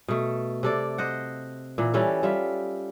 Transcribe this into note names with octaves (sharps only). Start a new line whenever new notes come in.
B2 A3
C3 A4 D5
C5 D#5 F#5
A#2 E3
E3 G3 C#4 A4
G3 F4 E5